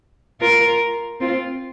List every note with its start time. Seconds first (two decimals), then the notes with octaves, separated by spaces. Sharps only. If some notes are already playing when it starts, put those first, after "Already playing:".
0.41 F4 A#4
1.21 C4 F4